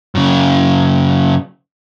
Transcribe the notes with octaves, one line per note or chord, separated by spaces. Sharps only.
F#2 C#3